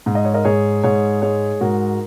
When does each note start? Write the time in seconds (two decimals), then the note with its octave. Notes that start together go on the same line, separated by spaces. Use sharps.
0.06 G#2
0.15 D#5
0.25 C#5
0.34 A#4 D#5
0.45 G#2 G#4 C#5
0.84 G#2 G#4 C#5
1.22 G#3 G#4 C#5
1.61 G#2 F#4 A#4